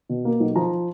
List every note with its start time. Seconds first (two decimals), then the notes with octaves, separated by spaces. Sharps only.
0.09 B2
0.25 A#3
0.40 B1
0.56 F3 A#5